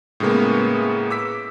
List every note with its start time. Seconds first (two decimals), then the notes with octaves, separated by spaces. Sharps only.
0.20 A2 C#3 G#3 A#3 B3
1.10 D6 E6 B6